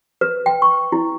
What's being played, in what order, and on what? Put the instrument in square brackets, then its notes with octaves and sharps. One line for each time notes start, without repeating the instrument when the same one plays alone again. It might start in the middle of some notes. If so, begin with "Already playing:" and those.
[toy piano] B4
G5
C#6
E4